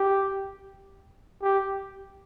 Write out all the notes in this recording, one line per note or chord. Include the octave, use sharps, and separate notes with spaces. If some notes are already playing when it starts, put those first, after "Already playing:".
Already playing: G4
G4